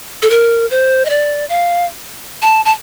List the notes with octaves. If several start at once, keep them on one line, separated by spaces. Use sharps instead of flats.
A4
A#4
C5
D#5
D5
F5
A5
A5